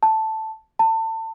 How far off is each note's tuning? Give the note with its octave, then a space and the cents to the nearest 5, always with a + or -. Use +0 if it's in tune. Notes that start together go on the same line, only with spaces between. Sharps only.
A5 +0
A5 +30